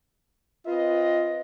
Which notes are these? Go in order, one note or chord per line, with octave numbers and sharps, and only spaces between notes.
C4 F4 B4 D#5